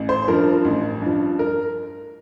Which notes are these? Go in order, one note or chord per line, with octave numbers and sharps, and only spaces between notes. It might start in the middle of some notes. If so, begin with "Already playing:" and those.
Already playing: A1
C5
G2 F3 A#4
A1
G2 F3
A#4